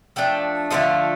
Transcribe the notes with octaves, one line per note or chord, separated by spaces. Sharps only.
F3 A3 D4 G5
D3 F3 A3 D#4 F5